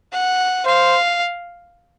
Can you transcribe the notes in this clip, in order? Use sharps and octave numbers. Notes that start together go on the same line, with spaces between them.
F#5
C5 F5